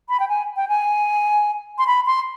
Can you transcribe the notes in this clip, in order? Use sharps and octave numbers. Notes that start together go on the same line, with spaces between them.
B5
G5
G#5
G5
G#5
C6
B5
C6